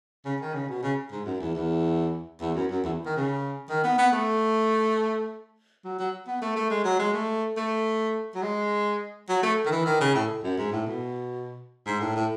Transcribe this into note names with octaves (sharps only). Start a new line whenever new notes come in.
C#3
D#3
C#3
B2
C#3
G#2
F#2
E2
E2
E2
F#2
F#2
E2
D#3
C#3
D#3
B3
B3
A3
F#3
F#3
B3
A3
A3
G#3
F#3
G#3
A3
A3
F#3
G#3
F#3
A3
D#3
E3
D#3
C#3
A2
F#2
G#2
A2
B2
G#2
A2
A2